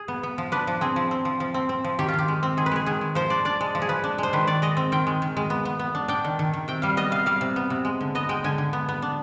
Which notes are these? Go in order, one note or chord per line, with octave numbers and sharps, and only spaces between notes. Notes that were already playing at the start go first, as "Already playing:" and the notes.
Already playing: G#4
B3
B3
F3
D4 B4
F3
C4 G#4
F3
C4
F3
F3
C4
C4
F3
D#3 G4
F4
D#3 G4
G#3
C4
D#3 G#4
B4
G#3 G#4
D#3 G#4
G#3
F3 C5
D4 D5
D4 D5
G#3
F3
G#4
F3 B4
D4
G#3 C5
D#3 B4
D#3 D5
G#3 D#5
C4
D#3 G5
G#3
D#3
G#3
B3
B3
B3
D4
D4 G5
D#3
D#3
D#3
C3 G5
G3 F5
B3 D#5
C3 F5
G3 F5
C3
B3
C3
G#3
D3
B3 D#5
G#3 G5
D3 G#5
D3
B3
B3
D4